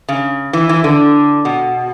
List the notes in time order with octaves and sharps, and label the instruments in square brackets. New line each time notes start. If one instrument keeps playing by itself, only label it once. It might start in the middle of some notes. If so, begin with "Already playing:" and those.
[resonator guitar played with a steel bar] C#3
E3
E3
D3
B2